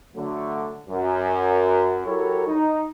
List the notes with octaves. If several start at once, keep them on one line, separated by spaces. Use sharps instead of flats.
D3 F#3 A3
F#2
F#3 E4 G4 A4 A#4 C#5
D#4